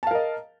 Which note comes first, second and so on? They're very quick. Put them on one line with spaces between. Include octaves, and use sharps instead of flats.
A5 F5 A#4 D#5